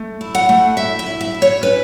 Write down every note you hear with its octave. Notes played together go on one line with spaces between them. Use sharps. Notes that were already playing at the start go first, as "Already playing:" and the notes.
Already playing: A3
E4
F#5
A3
E4 E5
E5
E4
E5
E4
C#5
C#4 B4